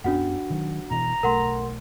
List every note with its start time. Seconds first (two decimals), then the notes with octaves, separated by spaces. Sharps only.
0.04 F#2 B3 C#4 D4 F#4 F#5
0.50 D#3 F#3
0.91 B2 E3 A#5
1.23 B1 A3 A#4 F#5 C6